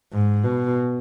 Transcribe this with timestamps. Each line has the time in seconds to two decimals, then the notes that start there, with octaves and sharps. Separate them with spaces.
0.13 G#2
0.44 B2